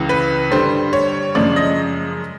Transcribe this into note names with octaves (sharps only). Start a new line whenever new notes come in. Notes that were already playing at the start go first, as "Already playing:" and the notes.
Already playing: C#2 C#3 E3
B4
G2 D3 G3 C5
C#5
F#2 C#3 F3 G#3 D5
D#5